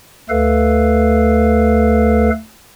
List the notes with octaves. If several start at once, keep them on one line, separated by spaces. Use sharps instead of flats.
D2 A3 A4 B4 F5